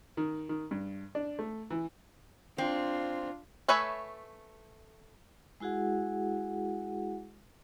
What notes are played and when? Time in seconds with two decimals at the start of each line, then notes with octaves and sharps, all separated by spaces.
0.17 D#3
0.49 D#3
0.71 G2
1.15 D4
1.39 A3
1.70 E3
2.58 C4 D4 F4
3.68 A3 B4 C#5 E5 G#5
5.60 G#3 E4 F#4 G#4 F#5